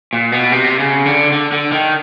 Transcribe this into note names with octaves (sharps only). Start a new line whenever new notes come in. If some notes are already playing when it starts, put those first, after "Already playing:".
A#2
B2
C3
C#3
D3
D3
D3
D#3